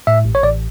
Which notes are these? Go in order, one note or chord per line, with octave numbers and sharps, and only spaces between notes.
A2 E5
A1
C#5
A1 D5